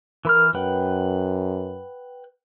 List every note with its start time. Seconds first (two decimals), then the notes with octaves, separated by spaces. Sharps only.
0.25 E3 A#4 B5 F6
0.55 F#2 B4 F#5 G5